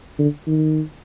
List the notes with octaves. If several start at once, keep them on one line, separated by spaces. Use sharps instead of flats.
D3
D#3